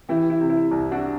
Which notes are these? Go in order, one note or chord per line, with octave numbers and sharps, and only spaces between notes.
E3 E4 G4
E4
C3
E4
C2
D4 F#4